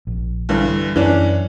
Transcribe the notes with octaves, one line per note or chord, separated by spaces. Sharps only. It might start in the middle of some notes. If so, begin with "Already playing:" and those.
A#1
G2 D3 E3
F#2 E3 C#4 D4